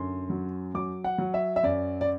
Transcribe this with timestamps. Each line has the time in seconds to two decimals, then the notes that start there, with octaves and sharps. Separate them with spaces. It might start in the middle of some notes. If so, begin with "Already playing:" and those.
Already playing: F#2 D3 C6
0.29 F#3
0.74 F#3 D6
1.04 F#5
1.18 F#3
1.34 E5
1.56 E5
1.63 F#2 D5
2.01 D5